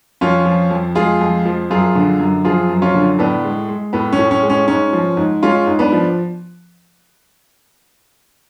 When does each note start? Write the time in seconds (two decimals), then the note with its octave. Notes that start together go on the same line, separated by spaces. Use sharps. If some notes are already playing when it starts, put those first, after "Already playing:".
0.21 F2 C#4 F4
0.46 F3
0.71 F2
0.95 G#3 F4 G#4
1.21 F2
1.45 F3
1.70 F#2 F4 G#4
1.95 D3
2.19 F#2
2.45 F3 F4 G#4
2.69 F#2
2.82 C#4 F4
2.94 D3
3.19 A2 B3 D4
3.44 G#3
3.69 G#3
3.93 A2 B3
4.13 C#4
4.19 A2
4.31 C#4
4.43 G#3
4.50 C#4
4.68 G#2 C#4
4.93 F3
5.17 G#2
5.42 G#3 C#4 F4
5.67 G#2
5.79 B3 D4
5.92 F3